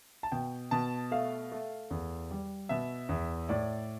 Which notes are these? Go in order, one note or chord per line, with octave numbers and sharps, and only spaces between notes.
A5
B2 G5
B2 A5
A3 F5
A3
E2
G3
B2 E5
E2
A2 D5